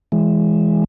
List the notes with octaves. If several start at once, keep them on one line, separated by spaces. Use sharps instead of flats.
E3 G#3